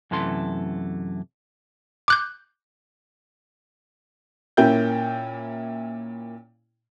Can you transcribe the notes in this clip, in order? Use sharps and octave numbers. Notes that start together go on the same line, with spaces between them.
F#2 C3 E3 A3 A4 C6
D6 F#6 G6
A#2 A#3 C#4 E4 G5 G6